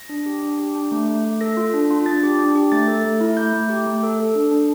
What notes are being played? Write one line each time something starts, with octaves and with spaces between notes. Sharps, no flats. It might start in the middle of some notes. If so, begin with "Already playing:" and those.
Already playing: A#6
D4
G4
D4
G4
D4
A3
A3
A3
A4 A#6
F4
D4
F4
D4 A6
G4
D4
G4
A3 A6
A4
A3
E4
A3 G6
A3
G4
A3
A4
A4
D4
D4